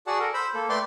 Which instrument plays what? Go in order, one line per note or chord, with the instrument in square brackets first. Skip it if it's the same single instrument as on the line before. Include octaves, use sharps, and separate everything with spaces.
[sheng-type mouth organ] F#4 G#4 D5 F#5 A5
A4 A#4
C5 B5 E6
A#3 A4
A3 B4 D5 G5 C6 D6